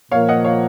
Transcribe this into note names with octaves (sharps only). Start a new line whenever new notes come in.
A#2 F3 A#3 C#5 F5
D#5 F#5
C#5 F5